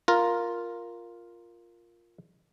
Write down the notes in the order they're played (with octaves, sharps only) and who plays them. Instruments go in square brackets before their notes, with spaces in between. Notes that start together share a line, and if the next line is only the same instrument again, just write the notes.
[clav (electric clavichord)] F4 A#4